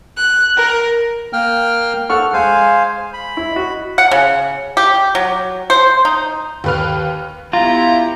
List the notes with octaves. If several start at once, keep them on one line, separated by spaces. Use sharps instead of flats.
F#6
A#4
A#3 G5 F6
A4 F#5 C#6 F6
G#3 C5 F5 G#5
B5
E4
F#4 D#5
F#5
C#3
G4
F#3
C5
D#4
D#2 B4 F6
B3 E4 F4 G4 A#5